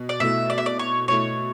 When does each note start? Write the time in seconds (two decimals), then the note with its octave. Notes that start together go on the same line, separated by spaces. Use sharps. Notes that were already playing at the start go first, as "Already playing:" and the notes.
Already playing: B2
0.09 D5
0.20 B2 A3 E4 E5
0.50 D5
0.58 E5
0.66 D5
0.79 C#5
1.08 B2 A3 E4 C#5